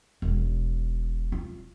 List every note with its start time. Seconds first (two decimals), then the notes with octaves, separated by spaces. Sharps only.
0.22 E1
1.32 F4